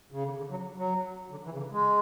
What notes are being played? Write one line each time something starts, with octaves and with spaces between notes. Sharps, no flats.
C#3
D3
D3
F#3
F#3
D3
E3
C#3
D3
G#3